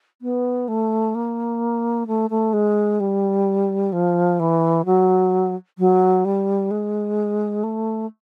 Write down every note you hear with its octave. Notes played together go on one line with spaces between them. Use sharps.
B3
A3
A#3
A3
A3
G#3
G3
F3
E3
F#3
F#3
G3
G#3
A3